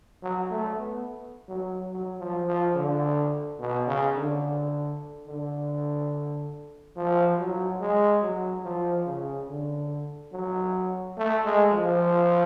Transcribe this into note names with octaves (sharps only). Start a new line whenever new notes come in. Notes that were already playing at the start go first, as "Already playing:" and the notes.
F#3
A3
B3
F#3
F#3
F3
F3
D3
B2
C#3
D3
D3
F3
F#3
G#3
F#3
F3
C#3
D3
F#3
A3
G#3
F3